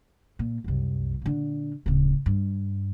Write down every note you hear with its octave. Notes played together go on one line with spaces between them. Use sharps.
A#2
C2 F#2
A#2 D3
D1 C#3
G2